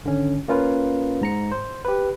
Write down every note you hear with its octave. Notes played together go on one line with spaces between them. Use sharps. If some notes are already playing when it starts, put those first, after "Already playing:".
G#1 D3 C#4
A#3 C#4 F4 A#4 B4
G#2 A#5 C#7
C5
G4 B4